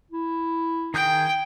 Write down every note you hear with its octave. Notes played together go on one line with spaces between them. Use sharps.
E4
D#3 G#4 G5 G6